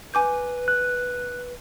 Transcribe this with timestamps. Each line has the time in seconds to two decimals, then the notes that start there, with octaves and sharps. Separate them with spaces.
0.14 B4 G#5 D6 G6
0.68 F#6